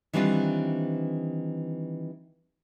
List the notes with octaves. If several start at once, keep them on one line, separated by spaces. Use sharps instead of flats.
D#3 E3 G3 C4 D4 F4